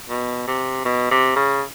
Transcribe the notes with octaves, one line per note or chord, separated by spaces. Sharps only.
B2
C3
B2
C3
C#3